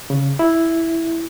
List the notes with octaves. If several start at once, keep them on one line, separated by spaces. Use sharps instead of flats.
C#3
E4